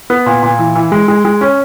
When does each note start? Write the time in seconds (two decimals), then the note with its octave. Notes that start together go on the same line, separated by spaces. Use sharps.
0.10 B3
0.26 A#2
0.43 A#2
0.59 E3
0.75 E3
0.92 G#3
1.08 G#3
1.25 G#3
1.41 C#4